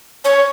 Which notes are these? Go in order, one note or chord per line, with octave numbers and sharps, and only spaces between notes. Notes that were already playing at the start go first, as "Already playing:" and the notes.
C#5